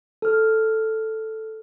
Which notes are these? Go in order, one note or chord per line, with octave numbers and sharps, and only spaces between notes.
A4 F6